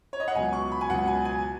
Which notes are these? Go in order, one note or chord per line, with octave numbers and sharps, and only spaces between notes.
C#5
D#5
F#5
C#2 B2 F#3 G#5
C#6
B5
G#5
C#2 B2 F#3 F#5
G#5
G#5